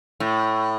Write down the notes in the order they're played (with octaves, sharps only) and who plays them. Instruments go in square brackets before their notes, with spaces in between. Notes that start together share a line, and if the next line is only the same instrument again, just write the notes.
[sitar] A2